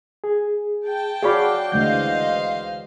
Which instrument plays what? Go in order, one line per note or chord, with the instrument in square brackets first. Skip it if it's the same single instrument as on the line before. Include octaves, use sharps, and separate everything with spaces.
[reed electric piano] G#4
[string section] G5 A5
[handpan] F#4 D5 F5 [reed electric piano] G#4 C#5 B5
[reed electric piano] D2 G6 [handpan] E3 G#3 [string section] C5 D#5 F5